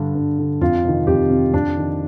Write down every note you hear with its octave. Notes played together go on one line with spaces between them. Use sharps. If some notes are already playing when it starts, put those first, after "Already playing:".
Already playing: G2 D3
G2
D3
F2 F4
C3 D#3
F2 G4
C3 D#3
F2 D4
D#3